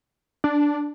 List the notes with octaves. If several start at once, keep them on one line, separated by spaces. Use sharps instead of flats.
D4